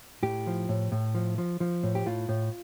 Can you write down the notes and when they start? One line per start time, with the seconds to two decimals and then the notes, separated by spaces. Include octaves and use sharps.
0.23 A2 G4
0.47 F3
0.69 A2
0.92 A2
1.15 F3
1.38 F3
1.60 F3
1.83 A2
1.95 G4
2.06 A2 F4
2.29 A2